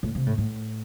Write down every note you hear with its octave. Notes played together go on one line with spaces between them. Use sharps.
A2
C3
A2
A2